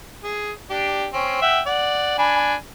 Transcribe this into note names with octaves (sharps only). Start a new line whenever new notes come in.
G#4
D4 G4
C4 C#4
E5 F#5 G5
D5 F#5
D4 G#5 B5